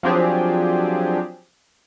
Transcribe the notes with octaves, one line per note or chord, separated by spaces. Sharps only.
F3 F#3 C4 D4 G4 G#4